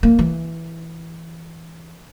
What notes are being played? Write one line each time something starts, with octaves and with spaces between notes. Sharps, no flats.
A#3
E3